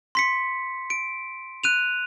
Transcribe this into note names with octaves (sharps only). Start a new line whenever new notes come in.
C6 B6 C#7
D7
F#6 D#7 F7